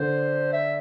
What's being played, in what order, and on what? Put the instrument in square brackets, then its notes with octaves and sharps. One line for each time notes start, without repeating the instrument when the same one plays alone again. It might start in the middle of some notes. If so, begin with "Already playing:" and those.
Already playing: [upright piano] D3 [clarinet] C5
[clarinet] E5